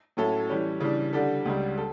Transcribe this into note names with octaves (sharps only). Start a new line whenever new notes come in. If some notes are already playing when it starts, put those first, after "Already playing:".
A2 F#3 C#4 E4 A4
E3 G3 C#4
C#3 E3 G3 D4
D3 G3 D4 A4
C#2 C#3 G3
A4